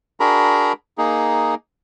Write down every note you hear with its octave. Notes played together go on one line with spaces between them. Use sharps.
D4 F#4 G#4 A#4 A#5 B5
A#3 D#4 G#4